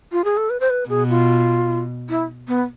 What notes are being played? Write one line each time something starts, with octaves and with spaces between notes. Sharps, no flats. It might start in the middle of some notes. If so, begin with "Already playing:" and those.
F4
G#4
A4
B4
C5
B4
B2 G#4
F4
E4
B3